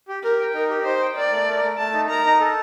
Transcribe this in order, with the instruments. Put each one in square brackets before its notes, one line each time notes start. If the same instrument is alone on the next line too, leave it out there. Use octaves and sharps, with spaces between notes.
[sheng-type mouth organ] G4
[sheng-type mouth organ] G4 [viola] A#4
[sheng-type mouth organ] G5
[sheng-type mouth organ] D#4 [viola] A#4
[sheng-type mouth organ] G4
[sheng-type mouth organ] D#4 [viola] C5
[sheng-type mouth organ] G5
[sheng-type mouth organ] A#4 [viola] D5
[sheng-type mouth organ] A3
A#4
A3
[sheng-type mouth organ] A3 [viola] A5
[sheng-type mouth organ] D#4
[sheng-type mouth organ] A#4 [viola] A#5
[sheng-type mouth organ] D#4
A4